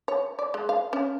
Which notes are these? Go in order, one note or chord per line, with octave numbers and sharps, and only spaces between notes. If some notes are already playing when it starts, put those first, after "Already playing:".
C#5
D5
G#3
F5
C#4